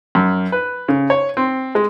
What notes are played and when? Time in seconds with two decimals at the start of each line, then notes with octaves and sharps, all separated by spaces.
0.15 F#2
0.52 B4
0.88 C#3
1.10 C#5
1.37 C4
1.75 G#3